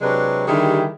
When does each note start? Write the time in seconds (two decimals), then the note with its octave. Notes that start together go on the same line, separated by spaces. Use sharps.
0.01 C3 F#3 G#3 D4 G4 B4
0.48 D3 D#3 G3 E4 G4 G#4